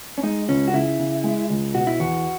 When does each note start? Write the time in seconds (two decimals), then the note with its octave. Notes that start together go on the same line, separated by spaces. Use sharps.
0.18 C#4
0.23 G#3 D#4
0.48 C#2 C#4
0.68 F#4
0.74 C#3 E4
0.99 C#3
1.24 G#3
1.50 C#2
1.74 B2 F#4
1.87 E4
2.00 E2 F#4